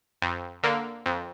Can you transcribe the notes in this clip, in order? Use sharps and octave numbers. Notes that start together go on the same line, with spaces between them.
F2
D3 A#3
F2